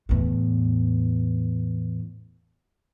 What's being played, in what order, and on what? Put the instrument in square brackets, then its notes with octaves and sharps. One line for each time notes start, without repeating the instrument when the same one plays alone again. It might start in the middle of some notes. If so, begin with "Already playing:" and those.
[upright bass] E2 A2